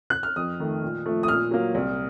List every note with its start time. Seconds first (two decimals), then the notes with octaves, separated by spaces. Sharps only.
0.10 F#6
0.23 F6
0.36 F2 D#6
0.60 D#3 A3
0.83 A#2
1.06 F3 A3
1.23 D#6
1.28 A#2 F6
1.51 F#3 A#3
1.74 C2